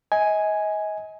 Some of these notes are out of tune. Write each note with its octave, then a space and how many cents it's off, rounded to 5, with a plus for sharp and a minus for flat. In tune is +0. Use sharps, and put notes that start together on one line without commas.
D#5 +35 G#5 +0